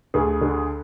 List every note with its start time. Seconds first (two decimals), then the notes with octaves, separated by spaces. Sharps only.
0.14 D2 G#4
0.41 D3